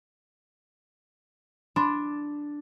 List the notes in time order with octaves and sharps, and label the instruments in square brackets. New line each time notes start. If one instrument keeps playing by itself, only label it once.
[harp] D4 [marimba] B5 C6